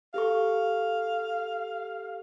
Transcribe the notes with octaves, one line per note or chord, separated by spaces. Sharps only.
G4 A4 F5 C#6